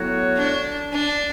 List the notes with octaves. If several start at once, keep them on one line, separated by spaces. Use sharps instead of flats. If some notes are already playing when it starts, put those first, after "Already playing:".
Already playing: A2 F#3 B3 F#4 C#5
D4
D4